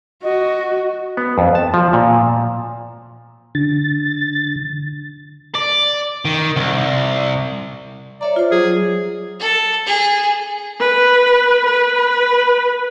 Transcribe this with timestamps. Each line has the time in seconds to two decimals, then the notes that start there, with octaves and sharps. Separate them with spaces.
0.23 F#4 D#5
1.17 B3
1.38 F2
1.55 A5
1.74 F3
1.93 A#2
3.55 D3 A6
5.55 D5
6.25 D#3
6.56 C2
8.21 C#5 D5 E5 A#5
8.36 F4 C5
8.52 F#3 G#4
9.40 A4
9.86 G#4
10.80 B4
11.66 B4